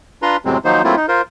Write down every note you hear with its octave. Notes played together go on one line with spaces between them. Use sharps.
D4 F4 B4 A#5 C6
E2 A2 C3 F#3 G#3 C4
D#3 F3 F#3 A#3 D#4 C5
F#3 A3 A#3 C4 E4 F4
D#4
F4 A#4 C5